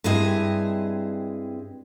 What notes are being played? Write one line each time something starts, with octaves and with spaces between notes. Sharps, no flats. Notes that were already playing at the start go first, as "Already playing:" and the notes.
G2 G#3 C4 E4 D#5 G#5